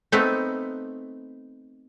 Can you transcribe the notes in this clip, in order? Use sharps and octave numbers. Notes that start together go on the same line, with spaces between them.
A3 B3 C4 D#4